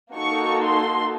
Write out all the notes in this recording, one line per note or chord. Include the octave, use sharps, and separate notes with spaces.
A#3 D#4 F#4 A4 C#6
C6